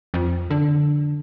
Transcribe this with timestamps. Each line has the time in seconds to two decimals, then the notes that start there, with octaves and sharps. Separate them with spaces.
0.14 F2
0.50 D3